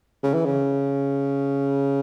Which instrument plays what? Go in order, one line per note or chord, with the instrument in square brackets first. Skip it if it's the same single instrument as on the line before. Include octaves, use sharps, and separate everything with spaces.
[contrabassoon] C#3
E3
C#3